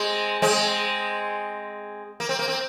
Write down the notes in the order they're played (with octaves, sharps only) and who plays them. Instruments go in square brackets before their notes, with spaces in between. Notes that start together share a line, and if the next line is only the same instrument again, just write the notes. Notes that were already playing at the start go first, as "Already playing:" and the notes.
Already playing: [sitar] G#3 C4
G#3 C4
A#3
C4
A#3
C4